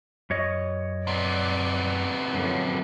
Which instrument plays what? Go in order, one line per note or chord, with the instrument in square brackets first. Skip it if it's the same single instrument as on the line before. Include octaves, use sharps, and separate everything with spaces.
[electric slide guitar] F#2 C#5 D#5
[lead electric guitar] C3 B3 [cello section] D5
[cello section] F#2 D3 F3